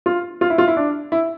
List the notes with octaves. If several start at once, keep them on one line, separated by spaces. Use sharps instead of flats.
F4
F4
E4
F4
E4
D4
E4